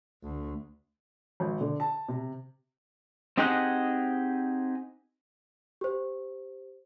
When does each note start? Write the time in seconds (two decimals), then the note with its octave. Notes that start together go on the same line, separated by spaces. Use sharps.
0.23 D2
1.40 G#1
1.61 D3
1.80 A5
2.09 C3
3.37 C4 D#4 G4 G#4 D#5 F#5
5.81 G4 C5